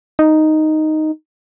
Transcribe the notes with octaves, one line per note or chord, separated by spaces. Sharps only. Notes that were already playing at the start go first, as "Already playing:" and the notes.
D#4